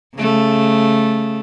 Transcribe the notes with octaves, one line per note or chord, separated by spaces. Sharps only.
C#3 A3